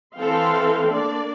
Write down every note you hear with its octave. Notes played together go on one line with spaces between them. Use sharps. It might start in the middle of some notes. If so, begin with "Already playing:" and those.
E3 C4 A4 F5 G5 C6
A#3 D4 D5